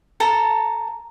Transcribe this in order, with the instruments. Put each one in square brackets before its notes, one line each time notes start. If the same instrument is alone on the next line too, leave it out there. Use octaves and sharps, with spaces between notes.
[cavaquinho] A4 A5 A#5